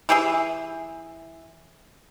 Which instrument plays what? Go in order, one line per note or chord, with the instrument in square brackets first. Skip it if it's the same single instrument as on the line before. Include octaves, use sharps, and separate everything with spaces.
[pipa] E3 G4 G#4 E5